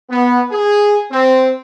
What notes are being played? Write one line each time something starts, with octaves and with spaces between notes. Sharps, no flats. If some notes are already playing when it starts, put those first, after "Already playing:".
B3
G#4
C4